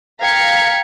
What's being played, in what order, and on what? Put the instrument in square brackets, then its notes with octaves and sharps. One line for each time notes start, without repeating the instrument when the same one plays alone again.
[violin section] F5 G5 A#5 G#6 B6 C#7